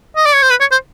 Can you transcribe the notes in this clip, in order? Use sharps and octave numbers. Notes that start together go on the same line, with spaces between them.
D#5
D5
C#5
C5
B4
C#5
C5